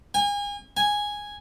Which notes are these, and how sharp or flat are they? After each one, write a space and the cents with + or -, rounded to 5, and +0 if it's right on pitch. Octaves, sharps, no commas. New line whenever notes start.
G#5 -35
G#5 -5